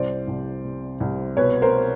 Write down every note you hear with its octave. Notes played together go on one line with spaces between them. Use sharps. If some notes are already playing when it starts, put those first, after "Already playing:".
Already playing: C2 C5 D5
C2
C3
C2
B2 B4 C#5
A#4 C5